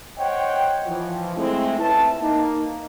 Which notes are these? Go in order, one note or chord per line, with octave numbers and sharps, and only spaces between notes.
C5 C#5 D#5 F#5 G5
E3 F3
G#3 A3 C4 E4
C#2 C#4 B4 E5 A5
A#3 D#4